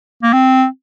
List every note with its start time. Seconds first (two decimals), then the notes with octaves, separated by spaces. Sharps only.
0.22 A#3
0.33 C4